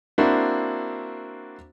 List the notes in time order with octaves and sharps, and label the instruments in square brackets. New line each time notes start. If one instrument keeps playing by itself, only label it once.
[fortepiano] A#3 C4 D4 E4 F#4